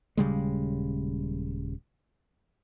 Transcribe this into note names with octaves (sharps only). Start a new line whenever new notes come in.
D#1 C#3 G3 G#3